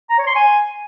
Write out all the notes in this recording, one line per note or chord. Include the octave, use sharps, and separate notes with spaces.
A#5
C#5
C6
G#5